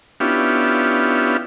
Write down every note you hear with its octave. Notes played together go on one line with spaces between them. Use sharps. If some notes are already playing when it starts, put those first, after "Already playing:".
B3 C#4 D4 E4 F4 G4